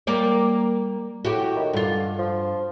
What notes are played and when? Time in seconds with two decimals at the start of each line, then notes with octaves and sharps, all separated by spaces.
0.07 G3 A#3 D5
1.25 A2 F#4 G4
1.56 D#3
1.73 G2 D3 F4
2.19 F3